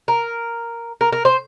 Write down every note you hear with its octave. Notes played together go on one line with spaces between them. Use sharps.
A#4
A#4
A#4
C5